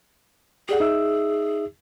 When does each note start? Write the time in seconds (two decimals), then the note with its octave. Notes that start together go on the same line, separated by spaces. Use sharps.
0.69 G4 G#4 D5 F#5
0.80 D#4 E5 E6